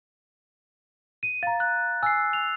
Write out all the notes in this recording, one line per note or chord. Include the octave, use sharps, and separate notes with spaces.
D#7
F5 A#5 A6
F#6
G#5 E6 C7
F7